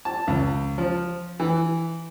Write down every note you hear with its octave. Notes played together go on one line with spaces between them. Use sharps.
A5
C#2
F3
E3